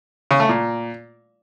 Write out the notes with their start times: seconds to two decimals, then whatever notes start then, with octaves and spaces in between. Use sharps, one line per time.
0.31 C#3
0.40 A3
0.49 A#2